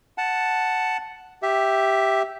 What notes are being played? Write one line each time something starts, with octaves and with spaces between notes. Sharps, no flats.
F#5 A5
G4 E5